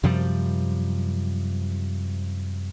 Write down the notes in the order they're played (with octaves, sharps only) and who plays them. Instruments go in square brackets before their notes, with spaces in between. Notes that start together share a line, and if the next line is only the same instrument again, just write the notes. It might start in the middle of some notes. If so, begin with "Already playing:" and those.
[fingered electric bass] F#2 C3 F3 G3